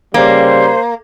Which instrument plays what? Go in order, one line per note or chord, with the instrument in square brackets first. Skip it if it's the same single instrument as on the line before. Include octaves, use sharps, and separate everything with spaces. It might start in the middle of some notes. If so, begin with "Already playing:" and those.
[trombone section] C#3 G3 [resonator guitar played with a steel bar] A#3 [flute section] C5